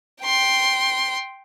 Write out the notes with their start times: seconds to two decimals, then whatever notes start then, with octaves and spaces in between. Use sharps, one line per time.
0.23 G5 C6